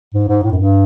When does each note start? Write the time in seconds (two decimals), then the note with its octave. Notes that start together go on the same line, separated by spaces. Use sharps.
0.14 G#2
0.28 G#2
0.43 A2
0.52 F#2
0.57 G2